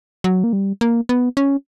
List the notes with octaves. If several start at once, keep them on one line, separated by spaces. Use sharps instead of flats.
F#3
A#3
G3
A#3
B3
C#4